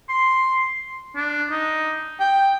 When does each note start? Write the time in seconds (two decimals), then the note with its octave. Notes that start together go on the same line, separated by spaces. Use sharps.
0.09 C6
1.16 D4
1.51 D#4
2.20 G5